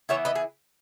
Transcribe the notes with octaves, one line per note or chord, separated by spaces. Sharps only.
E3 B3 E4 C#5 E5
B4 D#5
G#4